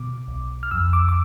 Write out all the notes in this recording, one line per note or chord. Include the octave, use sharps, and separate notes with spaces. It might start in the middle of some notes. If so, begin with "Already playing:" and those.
Already playing: B2 D6
B1
F6
F2 E6
D6
D6